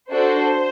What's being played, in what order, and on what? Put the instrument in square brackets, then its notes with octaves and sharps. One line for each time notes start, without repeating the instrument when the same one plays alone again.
[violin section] D4 F#4 A4 C5